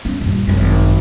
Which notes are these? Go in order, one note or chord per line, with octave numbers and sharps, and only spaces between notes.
G1 C#4
G2 A#2
G#1 F#2